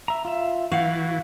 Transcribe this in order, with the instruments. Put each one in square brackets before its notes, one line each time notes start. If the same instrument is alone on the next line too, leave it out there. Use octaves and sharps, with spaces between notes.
[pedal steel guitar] E5 A#5
F4 E5
[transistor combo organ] E3 [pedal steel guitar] F#4 F#5 G6 [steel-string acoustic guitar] F5